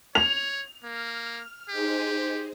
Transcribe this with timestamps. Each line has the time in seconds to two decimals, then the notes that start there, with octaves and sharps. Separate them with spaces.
0.15 C#5 F7
0.84 A#3 F6
1.69 D#4 G4 G#4 C5